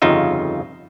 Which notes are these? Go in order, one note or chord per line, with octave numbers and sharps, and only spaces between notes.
G1 F2 C#3 D#4 F4 E5